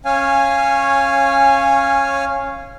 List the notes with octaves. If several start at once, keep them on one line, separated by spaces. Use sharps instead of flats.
C#4 C#5 F5 G#5